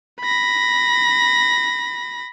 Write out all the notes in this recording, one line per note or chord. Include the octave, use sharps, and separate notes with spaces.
B5 A#6